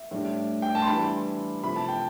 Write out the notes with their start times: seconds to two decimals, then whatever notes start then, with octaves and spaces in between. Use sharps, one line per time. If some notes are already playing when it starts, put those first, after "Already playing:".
Already playing: E5
0.11 A2 G3 D4
0.62 G5
0.75 A5
0.82 C6
0.87 E3 G3 D4 B5
1.63 C3 F3 A3 B5
1.76 A5
1.88 G5